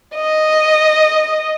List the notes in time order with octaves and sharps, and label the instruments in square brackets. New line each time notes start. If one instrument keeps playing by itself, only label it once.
[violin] D#5